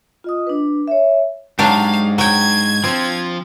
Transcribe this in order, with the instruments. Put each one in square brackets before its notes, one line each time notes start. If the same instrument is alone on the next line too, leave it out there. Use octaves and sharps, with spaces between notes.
[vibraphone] F4 D#5 D#6
D4 B4
C#5 E5
[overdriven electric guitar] G#2 [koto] F#3 D4 G4 [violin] F5
[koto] F#3 G5 [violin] G#6
[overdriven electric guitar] F3 [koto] C4